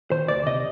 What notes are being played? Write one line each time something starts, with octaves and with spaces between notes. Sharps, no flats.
D#3 C5
D2 D5
C3 D#5